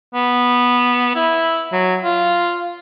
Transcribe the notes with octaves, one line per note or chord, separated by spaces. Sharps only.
B3
E4
F#3
F4